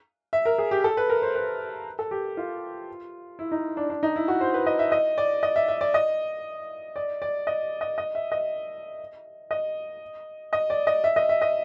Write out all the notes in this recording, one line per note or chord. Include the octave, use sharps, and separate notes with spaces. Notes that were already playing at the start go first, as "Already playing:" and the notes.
E5
A#4
G#4
G4
A4
B4
A#4
C5
B4
A4
G4
F4
E4
D#4
D4
D4
D#4
E4
F#4
C5
B4
D#5
E5
D#5
D5
D#5
E5
E5
D5
D#5
D5
D5
D#5
D#5
D#5
E5
D#5
D#5
D#5
D5
D#5
E5
D#5
E5
D#5